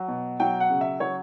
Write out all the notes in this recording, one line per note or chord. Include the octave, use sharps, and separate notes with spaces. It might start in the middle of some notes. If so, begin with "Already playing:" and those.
Already playing: F#3
B2
F#3 G5
F#5
C#3
E5
F#3 C#5